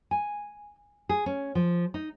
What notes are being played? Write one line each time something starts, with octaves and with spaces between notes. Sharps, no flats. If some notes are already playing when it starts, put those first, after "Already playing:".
G#5
G#4
C#4
F3
D#4